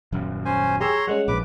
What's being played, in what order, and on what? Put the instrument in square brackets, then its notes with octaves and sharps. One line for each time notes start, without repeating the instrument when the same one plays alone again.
[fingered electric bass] D#1 F#2
[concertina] C#4 C5 G#5
[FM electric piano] G4 G#4 E6 [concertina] C#5 A#5 C6
[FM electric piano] G3 G#3 C#4 [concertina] F#5
[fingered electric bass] A#1 G#2 [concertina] B4 D6